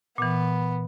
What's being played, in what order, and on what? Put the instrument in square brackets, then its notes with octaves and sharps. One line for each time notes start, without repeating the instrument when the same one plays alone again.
[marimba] A#2 E3 [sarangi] B3